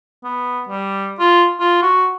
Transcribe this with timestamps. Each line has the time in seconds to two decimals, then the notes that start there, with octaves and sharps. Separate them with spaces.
0.24 B3
0.69 G3
1.19 F4
1.60 F4
1.82 F#4